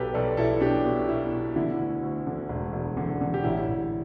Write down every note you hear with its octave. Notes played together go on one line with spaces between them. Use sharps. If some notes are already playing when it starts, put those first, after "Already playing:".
Already playing: B1 B2 G4 A4 B4
B1 A4 D5
B1 E4 A4
B2 D4 G4
B2
B2 E4
B2
D3 E4
D2
D2
D3
E1
E1
D3
D3
G4
A1 E4
A1